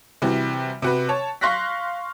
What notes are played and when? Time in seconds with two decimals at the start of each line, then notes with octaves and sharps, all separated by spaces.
0.22 C3 E3 G3 F#4
0.82 C3 F#4 B4
1.09 C#5 A5
1.41 F5 C6 C#6 F#6 A#6 B6